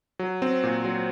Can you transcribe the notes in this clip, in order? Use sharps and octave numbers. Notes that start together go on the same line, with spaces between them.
F#3
C4
A#2
F#3